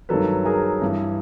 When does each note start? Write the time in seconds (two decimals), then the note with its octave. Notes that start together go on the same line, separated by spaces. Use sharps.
0.09 G2 D#3 F#3 A4 B4
0.45 G#4 A#4
0.82 G2 E3